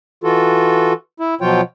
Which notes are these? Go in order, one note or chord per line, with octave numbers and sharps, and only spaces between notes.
E3 F4 F#4 A4
E4
B2 F3 F#3 F4 C#5 G5